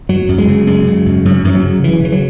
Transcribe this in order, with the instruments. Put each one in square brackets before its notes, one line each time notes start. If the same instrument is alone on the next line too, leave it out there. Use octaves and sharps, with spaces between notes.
[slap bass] F#2 F#3
F#2
G#3
C#3
F#2 G#3
C#3
F#2
F#2 F#3
F#2 E3
F#3
C#3
C#3 E3
C#3 E3
F#3